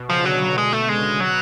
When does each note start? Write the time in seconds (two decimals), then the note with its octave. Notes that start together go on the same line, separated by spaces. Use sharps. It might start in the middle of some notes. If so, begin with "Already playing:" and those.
Already playing: B2
0.10 C#3 F3
0.25 B2 D3 F#3
0.58 G#3
0.73 A3
0.89 C#3 G#3
1.04 C#3
1.20 B2 F#3